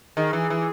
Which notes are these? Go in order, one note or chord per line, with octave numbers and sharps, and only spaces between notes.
D#3 G#4
E3
E3